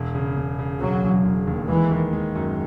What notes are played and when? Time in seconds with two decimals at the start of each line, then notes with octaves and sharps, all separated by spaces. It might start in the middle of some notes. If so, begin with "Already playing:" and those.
Already playing: E1
0.15 C#3
0.36 E1
0.59 C#3
0.80 E1 F#3
1.03 E1
1.25 E1
1.47 D#2
1.68 E3 G#3
1.91 D#3
2.13 G#3
2.35 F#2